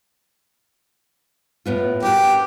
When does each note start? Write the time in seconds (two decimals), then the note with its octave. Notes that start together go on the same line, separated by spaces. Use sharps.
1.66 A2 B3 F4
2.03 F#4 G4 A#4
2.24 D4